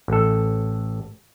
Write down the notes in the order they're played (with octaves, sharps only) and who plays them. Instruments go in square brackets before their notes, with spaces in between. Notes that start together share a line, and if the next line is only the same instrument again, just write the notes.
[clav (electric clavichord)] A1 A4